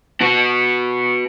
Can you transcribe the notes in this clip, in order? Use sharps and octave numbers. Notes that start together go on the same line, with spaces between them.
B3 F#4